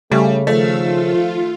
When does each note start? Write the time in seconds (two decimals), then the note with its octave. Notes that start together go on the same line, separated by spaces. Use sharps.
0.12 C#3 G3 A3
0.47 D#3 F3 A3 F5 E6
0.77 F4